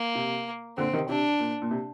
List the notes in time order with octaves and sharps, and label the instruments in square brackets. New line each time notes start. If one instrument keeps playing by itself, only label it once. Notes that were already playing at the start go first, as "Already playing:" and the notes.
Already playing: [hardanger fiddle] A#3
[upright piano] C3
[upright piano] A#2 D3 [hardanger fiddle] C4
[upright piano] C3 D#3
[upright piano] C3 [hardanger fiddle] D4
[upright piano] A#2
A#2
C3